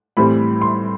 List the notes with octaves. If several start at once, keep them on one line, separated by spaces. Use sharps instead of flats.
A2 E3 G3 C4 B5
C6